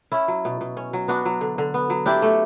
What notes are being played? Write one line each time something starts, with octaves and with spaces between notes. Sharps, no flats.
C#4 E4
F#3
B2
B2
C#4
F#3
B3 D4 F#4
F#3
D3
D3
B3
F#3
D4 E4 G4
A3